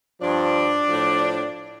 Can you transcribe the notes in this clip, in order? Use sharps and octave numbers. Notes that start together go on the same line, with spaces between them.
G2 F3 D4
A2 F3